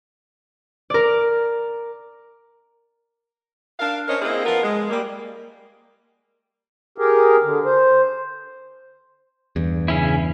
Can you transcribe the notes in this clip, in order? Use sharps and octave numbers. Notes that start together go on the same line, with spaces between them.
A#4 D5
D4 A#4 F5
C#4 A#4 C5 C#5 D#5
A#3 C4 E4 G#4 D#5
F3 B3 F4 A#4
G#3
G3 A#3
G4 G#4 A#4
D3
C5
E2 G2
C#3 C#4 E4